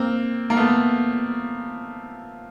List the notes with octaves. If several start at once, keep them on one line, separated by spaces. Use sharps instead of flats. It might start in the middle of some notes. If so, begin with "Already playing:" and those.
Already playing: A#3 C4
A#3
A3 B3